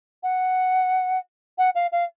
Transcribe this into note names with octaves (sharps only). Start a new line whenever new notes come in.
F#5
F#5
F5
F5